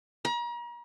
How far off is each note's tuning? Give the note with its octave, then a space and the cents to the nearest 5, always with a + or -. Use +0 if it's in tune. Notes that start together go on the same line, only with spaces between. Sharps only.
A#5 +40